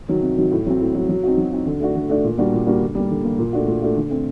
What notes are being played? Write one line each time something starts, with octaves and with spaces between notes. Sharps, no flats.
D#3 F#3
C3
D#3 F#3
A2
F#3 C4
A2
F#3 C4
F#3
C4 D#4 F#4
F#3
C4 D#4 F#4
D3
A3 D4 F#4
D3
A3 D4 F#4
A#2
G3 A#3 D4 F#4
A#2
G3 A#3 D4 F#4
D3
G3 A#3
D3
G3 A#3
A#2
A3 D4 F#4
A#2
A3 D4 F#4
D3
A3 C4